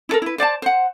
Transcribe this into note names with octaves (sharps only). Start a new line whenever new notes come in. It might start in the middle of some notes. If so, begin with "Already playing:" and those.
E4 A4 A#4
E4 B4
C5 D5 F#5 A5
C5 F#5